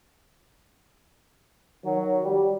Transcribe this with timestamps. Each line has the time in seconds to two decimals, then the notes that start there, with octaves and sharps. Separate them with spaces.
1.85 D#3 F#3
2.25 G3